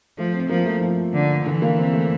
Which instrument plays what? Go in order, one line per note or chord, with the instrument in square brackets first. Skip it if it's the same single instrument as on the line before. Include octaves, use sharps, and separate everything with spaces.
[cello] F3 [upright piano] A3
[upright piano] C4
[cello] F3 [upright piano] A#3
[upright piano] A3
F3
[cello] D3
[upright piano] D3 [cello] E3
[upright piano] A#3
C4
A3